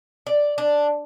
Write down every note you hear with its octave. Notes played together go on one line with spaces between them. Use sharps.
D5
D4